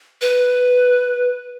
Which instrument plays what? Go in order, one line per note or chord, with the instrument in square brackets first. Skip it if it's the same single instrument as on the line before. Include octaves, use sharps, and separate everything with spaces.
[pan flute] B4